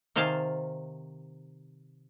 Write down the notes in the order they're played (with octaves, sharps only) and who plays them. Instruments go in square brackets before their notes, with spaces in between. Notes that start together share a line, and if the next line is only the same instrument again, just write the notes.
[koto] C3 D#3 C5 F5 G#5 A5